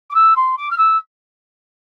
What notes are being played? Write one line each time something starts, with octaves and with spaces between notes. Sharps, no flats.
D6
E6
C6
D6
F6
E6